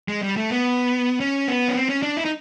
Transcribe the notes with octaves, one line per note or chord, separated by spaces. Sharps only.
G#3
G3
A3
B3
C#4
B3
C#4
C4
C#4
D4
E4
D#4